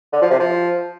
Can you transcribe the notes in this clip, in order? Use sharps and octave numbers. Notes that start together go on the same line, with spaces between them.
D3
F3
C3
F3